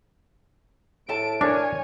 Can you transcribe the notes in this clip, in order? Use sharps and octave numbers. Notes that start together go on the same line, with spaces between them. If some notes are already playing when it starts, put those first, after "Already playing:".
A2 A4 A5 D7
D4 A#4 C#5 G#5